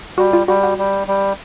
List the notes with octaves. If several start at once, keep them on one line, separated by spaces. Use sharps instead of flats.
G3 F#4
F4
G3 F#4
F#4
G3
G3